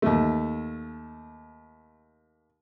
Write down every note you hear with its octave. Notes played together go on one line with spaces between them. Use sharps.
D#2 A3